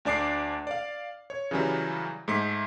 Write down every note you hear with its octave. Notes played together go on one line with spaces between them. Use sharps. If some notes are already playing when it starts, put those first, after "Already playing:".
D2 D4 D5 D6 C7
D5 F5
C#5
C#3 E3 F#3 G3
G#2 A3 B6